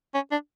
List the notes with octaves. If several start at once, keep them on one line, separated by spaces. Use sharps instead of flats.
C#4
D4